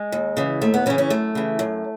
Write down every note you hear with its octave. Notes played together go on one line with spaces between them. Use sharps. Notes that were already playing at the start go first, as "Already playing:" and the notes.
Already playing: G#3
D#2
C#3 E3
D#2 A3
B3
C#3 E3 C#4
C#4
F#2 A3
C#3 E3
F#2